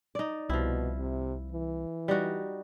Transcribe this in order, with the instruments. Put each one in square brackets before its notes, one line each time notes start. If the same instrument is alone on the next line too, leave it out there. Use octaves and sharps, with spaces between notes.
[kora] D#4 D5
[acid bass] C2 [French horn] B2 [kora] F3 E4
[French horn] C3
E3
[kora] G3 D#4 F#4